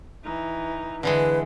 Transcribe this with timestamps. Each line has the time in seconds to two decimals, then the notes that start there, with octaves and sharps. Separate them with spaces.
0.23 E3 D#4
1.03 D3 E3 G#3 E4 B4